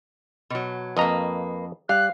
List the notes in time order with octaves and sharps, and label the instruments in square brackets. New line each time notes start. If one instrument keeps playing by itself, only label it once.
[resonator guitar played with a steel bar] B2 F#3
[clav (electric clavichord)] F2 D#5 A#5 [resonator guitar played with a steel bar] A#3 B4
[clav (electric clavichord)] G3 [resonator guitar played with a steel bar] F5 [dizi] F#6